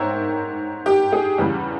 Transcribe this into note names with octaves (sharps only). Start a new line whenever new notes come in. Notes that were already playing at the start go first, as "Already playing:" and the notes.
Already playing: G#2 A#4 C5 C#5 E5 G5 A#5
G4
G#4
E2 C#3 E3 G3